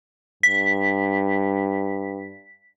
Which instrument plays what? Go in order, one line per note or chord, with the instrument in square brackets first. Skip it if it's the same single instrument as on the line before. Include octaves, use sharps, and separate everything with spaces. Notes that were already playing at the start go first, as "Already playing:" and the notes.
[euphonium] G2 [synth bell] B6